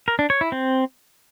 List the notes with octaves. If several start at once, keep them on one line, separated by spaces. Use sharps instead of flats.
A#4
D4
C#5
E4
C4